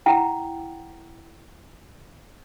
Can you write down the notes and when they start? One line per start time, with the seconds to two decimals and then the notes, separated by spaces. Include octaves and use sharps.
0.06 E4 F#5 G5 A#5